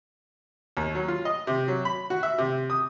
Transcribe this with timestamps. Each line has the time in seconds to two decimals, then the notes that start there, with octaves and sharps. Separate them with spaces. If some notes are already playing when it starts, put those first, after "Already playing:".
0.77 D#2
0.95 F#3
1.08 F4
1.25 D#5
1.47 C3
1.68 F#3
1.85 B5
2.10 F#4
2.23 E5
2.38 C3
2.70 D#6